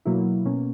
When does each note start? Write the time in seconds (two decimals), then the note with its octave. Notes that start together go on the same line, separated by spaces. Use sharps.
0.05 B2 F#3 A#3 E4
0.45 B2 A#3 C#4